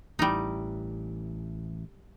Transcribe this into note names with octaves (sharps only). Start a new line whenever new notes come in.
A1 E3 G3 D#4